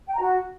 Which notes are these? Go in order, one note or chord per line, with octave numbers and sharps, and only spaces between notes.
G5
A#5
F#4